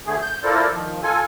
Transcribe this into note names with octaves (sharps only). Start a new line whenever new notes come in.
D2 D3 A3 G#4
G6
E4 F4 A4 A#4 C5 D5
D#3 F3
F4 A4 G#5